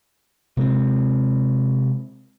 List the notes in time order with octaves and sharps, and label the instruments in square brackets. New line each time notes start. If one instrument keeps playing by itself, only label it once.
[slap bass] C3 G#3 C4